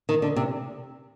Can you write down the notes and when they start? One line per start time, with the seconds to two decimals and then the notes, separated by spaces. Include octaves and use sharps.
0.09 D#3
0.22 D3
0.36 C3